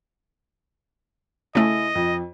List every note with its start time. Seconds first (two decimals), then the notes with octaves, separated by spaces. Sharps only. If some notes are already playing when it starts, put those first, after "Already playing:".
1.55 C#3 A3 E4 D#5 G#5
1.95 F2